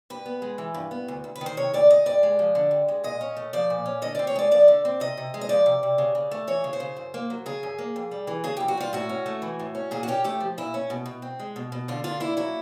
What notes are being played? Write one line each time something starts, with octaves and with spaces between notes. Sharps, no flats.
G2 B4
B3
G#3
E3
G2
B3
D2
D2
B4
D#3
C5
C3 C#5
D2 D5
D2 D#5
G2 D5
G#3
F3
D3
G2
G#3
A#2 D#5
C#4
A3
F3 D5
A#2
C#4
D3 D#5
C4 D5
C#5
G#3 D5
F3 D5
D3
C4
C3 D#5
C3
G#3
D#5
F3 D5
C3
C3
C#3
C#3
A3
E3 C#5
C#3
C5
C#3
F#2
A#3
F#3
C#3 G#4
F#2
A#3
F2
G3
E3
C#3 G#4
F2 G4
F#4
G3 F4
A2 F#4
C#4
A3
E3
A2
C#4
A#2 G#4
F#4
C#4 G4
A3 G4
F3
A#2 E4
C#4
B2
B2
C4
G#3
B2
B2
D3 F4
D4 F4
A#3 E4
F#3 E4